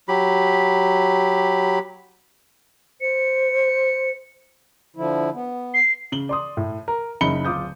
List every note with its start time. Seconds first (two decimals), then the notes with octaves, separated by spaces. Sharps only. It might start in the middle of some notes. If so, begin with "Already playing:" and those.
0.08 F#3 G4 B5
3.01 C5 C#7
4.96 D3 F3 E4
5.35 B3
5.74 C7
6.12 C#3 F#7 G7
6.29 D5 C6 D#6
6.57 A2
6.88 A#4
7.21 F#1 C#3 D#4 B5 C#7 G7
7.45 D1 F4 D6 D#6 G6